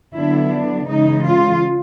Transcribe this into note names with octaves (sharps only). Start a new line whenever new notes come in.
D3 F#3 B3 D4 E4
D4
C#3 E3 G#3 D#4
F4